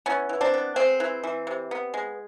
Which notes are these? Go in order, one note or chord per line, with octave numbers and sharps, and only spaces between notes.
E3 B3 C#4
E3
C4 D4
B3
G#3 C4
E3
E3
C3
B3
G#3